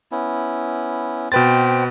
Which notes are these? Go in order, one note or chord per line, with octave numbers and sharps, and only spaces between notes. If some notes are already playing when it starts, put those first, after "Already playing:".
B3 C#4 E4
B2 C4 B4 C5 G5 A6